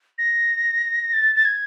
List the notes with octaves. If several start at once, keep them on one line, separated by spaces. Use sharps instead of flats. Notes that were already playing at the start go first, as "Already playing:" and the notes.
A#6
A6
A6
G#6